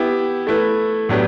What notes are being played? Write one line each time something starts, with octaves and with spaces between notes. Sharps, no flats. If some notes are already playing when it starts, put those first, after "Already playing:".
Already playing: B3 E4 G4
A3 E4 B4
A2 F#3 B3 D4 G4